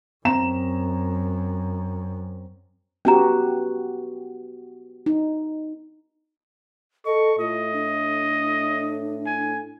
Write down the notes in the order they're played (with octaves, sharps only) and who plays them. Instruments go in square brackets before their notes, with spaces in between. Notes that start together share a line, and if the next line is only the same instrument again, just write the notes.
[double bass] F#2 [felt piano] C4 A#5 E7
[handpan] B3 F#4 G4 [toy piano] C#4 A#5
[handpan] D#4
[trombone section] A4 [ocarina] D#5 [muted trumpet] C#6
[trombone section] A2 [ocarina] F4 [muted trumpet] D#5
[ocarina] D4
[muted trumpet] G#5